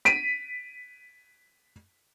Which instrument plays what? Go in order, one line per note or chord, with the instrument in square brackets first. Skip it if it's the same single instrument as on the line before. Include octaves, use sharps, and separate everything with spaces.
[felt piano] B6 D7 D#7